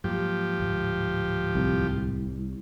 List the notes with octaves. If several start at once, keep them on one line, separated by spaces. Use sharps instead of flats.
G#2 F3 F#3 A#3 G4
D1 G#2
C2